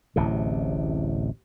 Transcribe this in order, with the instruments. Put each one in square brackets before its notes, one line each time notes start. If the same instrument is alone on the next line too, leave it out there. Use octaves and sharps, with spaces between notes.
[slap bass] D1 A1 A2 C3